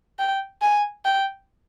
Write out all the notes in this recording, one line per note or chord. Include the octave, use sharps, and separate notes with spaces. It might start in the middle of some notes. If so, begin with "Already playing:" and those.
G5
G#5
G5